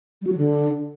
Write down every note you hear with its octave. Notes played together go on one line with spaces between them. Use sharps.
G3
F#4
F#3
D3